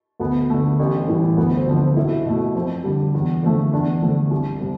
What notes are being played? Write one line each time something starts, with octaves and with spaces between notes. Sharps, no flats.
D2 B3
D3 A3
A1
A2 E3 G3
D2 B3
C4
D3 F3
C4
B1 E4
B2 A3
F2 C4
D3 G3
E2
D3 F3 A3
E2 D4
D3 F3 A3
C2
C3 G3